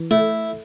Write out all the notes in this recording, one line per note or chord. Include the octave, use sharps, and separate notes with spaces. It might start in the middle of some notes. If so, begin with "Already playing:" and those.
Already playing: E3
A3 E4